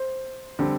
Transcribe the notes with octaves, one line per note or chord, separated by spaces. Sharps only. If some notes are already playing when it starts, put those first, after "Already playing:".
Already playing: C5
D3 G3 C4